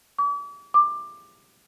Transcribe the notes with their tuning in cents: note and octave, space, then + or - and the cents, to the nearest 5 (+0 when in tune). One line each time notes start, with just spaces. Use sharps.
D6 -40
D6 +20